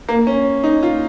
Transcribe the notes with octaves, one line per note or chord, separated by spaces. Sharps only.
A#3
C#4
D#4
F4